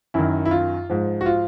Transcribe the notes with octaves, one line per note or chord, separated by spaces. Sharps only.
F#2 D#3 E4
E4
F4
G#2 F3
F#4
F4